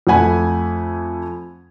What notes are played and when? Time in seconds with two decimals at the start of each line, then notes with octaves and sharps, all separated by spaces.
0.07 F2 A3 F#5 G#5 B5